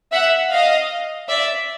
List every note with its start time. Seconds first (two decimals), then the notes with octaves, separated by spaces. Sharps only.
0.12 E5 F#5
0.51 D#5 F5
1.28 D5 E5